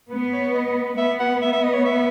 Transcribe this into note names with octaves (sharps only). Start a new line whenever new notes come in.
B3 B4
C#5
D#5
B3 E5
F#5
E5
E5
D#5
C#5
E5